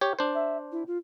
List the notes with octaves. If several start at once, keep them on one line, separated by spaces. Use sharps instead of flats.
G4 C#5
D4 C5
E5
E4
F4